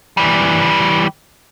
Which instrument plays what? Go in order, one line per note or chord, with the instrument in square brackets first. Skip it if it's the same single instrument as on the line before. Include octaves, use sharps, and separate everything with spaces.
[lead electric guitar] E3 G3